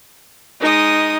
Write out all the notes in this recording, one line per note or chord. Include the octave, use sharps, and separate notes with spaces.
G#3 D#4 D#6